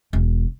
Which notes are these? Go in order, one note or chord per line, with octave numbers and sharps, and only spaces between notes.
E1